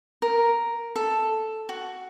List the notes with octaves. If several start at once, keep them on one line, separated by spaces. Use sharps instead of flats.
A#4
A4
F#4